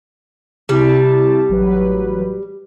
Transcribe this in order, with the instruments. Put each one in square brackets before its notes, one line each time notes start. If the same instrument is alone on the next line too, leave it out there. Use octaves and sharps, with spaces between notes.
[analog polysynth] C3 E4 A5 [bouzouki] G3
[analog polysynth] A1 F#3 B4